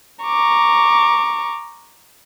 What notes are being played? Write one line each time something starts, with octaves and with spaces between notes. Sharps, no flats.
A#5 C#6 D6